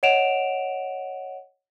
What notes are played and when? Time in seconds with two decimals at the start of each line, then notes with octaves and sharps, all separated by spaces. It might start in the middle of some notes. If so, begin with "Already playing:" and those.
0.03 C#5 D#5 F#5 D7 E7 F7